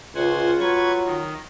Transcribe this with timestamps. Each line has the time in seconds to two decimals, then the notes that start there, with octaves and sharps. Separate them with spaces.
0.15 C#2 F4 C5 F#5 G#5
0.60 F#3 B4 C#6 G#6
1.06 D#3